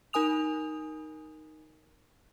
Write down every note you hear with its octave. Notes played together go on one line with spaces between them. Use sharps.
D#4 A#4 G#5 D#6 F7